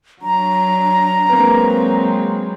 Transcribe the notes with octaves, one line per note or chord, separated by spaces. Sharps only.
F#3 D4 A#5
F#3 G#3 A#3 C4 B4